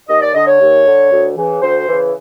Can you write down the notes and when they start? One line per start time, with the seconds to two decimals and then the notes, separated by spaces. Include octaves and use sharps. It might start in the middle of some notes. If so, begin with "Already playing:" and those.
0.08 D#2 D#5
0.22 D5
0.34 D3 D#5
0.47 C#5
0.60 D#2
0.86 D3
1.11 D2
1.37 C#3 E3
1.61 D2 C5
1.87 C#3 E3